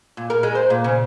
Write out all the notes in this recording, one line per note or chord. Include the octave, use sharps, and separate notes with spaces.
A#2
A#4
G#3
C5
A#2
C#3